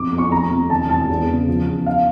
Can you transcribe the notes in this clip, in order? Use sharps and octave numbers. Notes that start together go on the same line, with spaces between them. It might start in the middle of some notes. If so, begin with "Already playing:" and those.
Already playing: F2 D6
F2
C#6
F1 A#5
F2
E1 A5
E1 A5
E2
C#3
F3
E2
F5